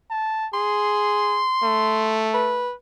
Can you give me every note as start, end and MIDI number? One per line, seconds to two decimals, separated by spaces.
0.10 0.47 81
0.54 1.44 68
0.54 2.26 84
1.63 2.72 57
2.34 2.72 71